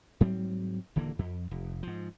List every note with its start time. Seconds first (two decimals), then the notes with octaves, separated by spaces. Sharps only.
0.21 G#2 F#3 G3 C4
0.96 D#1 D3 E3 A#3
1.19 F2
1.51 F1
1.83 G#2 F3